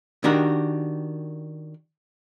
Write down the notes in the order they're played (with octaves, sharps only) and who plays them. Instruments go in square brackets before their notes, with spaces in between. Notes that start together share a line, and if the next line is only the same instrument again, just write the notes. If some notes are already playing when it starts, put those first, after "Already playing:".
[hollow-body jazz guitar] D#3 D4 F#4 G4 A#4